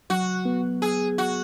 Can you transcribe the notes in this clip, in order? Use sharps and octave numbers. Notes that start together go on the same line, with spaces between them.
F#3 F#4
B3
G#4
F#4